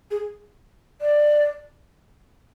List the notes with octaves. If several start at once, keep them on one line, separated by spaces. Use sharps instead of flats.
G#4
D5